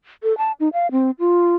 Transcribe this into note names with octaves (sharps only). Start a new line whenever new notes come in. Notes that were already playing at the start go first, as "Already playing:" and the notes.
A4
A5
D#4
F5
C4
F4